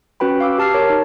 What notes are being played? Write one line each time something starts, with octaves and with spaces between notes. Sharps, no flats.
C#4 F#4 B4 G5 B5
F5 D6 E6
G4 A5 F6 C7
A#4 C#5
D#4